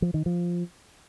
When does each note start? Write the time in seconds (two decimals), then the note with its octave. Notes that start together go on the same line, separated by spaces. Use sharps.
0.02 F3
0.14 D#3
0.26 F3